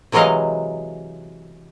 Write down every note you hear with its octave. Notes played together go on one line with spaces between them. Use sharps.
C3 E3 F#3 G#3 D#5 F5